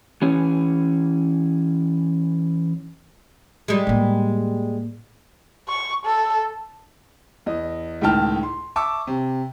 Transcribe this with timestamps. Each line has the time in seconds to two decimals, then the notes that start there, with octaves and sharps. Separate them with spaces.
0.22 E3 C#4
3.68 G3 G#3
3.87 A2 A#3
5.69 C#6
6.06 A4
7.46 E2 D#5
8.01 C#2 A2 D#3 G5 A5 F6
8.43 C6
8.76 E5 A5 C#6 D6 E6
9.07 C3